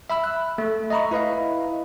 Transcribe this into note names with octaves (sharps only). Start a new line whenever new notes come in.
E5 B5 E6
F#6
A3
D#5 E5 A#5 B5 C#6
E4 B4 D#5 F5